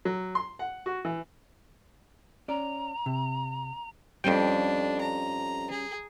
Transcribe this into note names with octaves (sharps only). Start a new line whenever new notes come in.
F#3
C6
F#5
F#4
E3
C#4 D5 A#5
C3
F2 G3 C#4 D4 G5
A#5
G#4